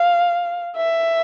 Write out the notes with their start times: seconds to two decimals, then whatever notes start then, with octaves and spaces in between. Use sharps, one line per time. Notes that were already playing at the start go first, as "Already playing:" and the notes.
Already playing: F5
0.77 E5